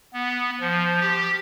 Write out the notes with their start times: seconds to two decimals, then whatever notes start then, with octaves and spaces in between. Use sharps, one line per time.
0.14 B3
0.61 F3
1.00 G4